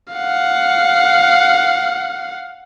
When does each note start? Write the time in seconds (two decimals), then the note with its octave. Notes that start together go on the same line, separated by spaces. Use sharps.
0.14 F5 F#5